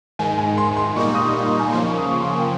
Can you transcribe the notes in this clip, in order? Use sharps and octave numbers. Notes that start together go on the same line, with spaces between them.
G#2 D#3 G#3 G#5
G#5
C6
C6
A#2 G3 A#3 D#4 C#6
D#6
C#6
C6
G#5
C#3 F3 A#3 C6
C#6
D#6
C#6
C6
G#5
G5